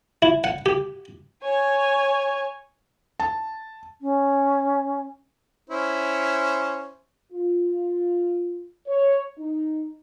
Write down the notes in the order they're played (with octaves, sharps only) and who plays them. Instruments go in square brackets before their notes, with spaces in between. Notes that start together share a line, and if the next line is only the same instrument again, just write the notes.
[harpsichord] E4
F#5
G4
[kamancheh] C#5 G#5
[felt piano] A5
[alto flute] C#4
[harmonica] C#4 E4 C5
[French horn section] F4
C#5
D#4